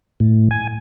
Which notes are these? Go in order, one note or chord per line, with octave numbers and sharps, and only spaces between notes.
A2
G#5